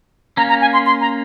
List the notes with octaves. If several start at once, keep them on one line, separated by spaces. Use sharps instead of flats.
A#3 C#4 A#5
A#5
G#5
C6
C6
A#5